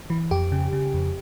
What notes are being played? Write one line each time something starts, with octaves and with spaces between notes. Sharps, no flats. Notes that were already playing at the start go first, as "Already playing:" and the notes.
E3
F2 G4
C#3
C#3
F2